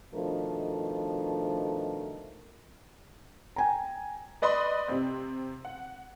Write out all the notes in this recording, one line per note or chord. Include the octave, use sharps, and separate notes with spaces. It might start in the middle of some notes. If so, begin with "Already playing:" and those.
B2 D#3 F3 A3 D4 A#4
G5 G#5 A#5
B4 D5 D#5 B5 C6
C3 C4
F#5